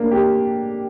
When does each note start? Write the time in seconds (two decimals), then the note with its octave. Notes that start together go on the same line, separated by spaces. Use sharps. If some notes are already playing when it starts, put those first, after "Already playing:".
Already playing: A#3 D4
0.11 G4